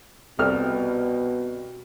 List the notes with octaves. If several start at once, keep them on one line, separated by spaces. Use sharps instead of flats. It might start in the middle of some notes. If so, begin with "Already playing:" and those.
C2 B2 A4 F6